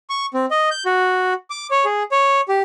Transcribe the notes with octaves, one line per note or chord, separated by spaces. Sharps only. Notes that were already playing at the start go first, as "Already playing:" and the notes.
C#6
C4
D#5
G6
F#4
D6
C#5
G#4
C#5
G4